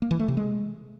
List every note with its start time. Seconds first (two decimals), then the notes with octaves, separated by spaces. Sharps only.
0.02 A#3
0.11 E3
0.19 A3
0.28 C3
0.37 G#3